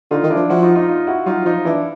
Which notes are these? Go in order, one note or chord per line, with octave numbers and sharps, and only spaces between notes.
D3 D#4 F4
D#3
D4 E4
F3
F3 E4 F#4
D#4 F4
D#4 F4
D#4 F4
E4 F#4
F#3 D#4 F4
F3 D#4 F4
E3 D4 E4